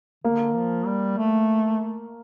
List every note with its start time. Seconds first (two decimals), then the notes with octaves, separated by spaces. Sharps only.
0.24 D3 A#3
0.56 F3
0.86 G3
1.18 A3